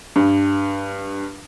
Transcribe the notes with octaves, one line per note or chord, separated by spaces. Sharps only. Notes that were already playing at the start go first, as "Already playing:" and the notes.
G2